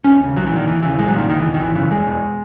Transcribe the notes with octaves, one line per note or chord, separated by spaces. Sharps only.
E1 C#4
D#2 C#3
B1 F#3
E3
A#2 D#3
E1 E3
D#2 C#3 E3
A#1 G#3
F#3
A#2 D#3
F#1 D#3
E3
E2 B2
D#3
G#1 E3
F#2 C#3 E3
E1 G#3
E2 B2